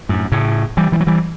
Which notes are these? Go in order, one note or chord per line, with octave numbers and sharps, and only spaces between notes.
F#2 A2
A2 C#3
E3 G3
E3 G3
F#3
E3 G3